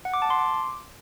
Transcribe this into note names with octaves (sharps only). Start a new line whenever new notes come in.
F#5
D6
A5
C6
D6